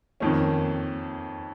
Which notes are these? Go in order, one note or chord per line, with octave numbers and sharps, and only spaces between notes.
F2 D#3 A#3 C#4